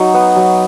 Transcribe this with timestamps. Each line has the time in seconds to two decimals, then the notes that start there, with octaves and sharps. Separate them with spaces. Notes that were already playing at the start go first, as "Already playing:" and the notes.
Already playing: F#3 D#4
0.14 B3
0.36 F#3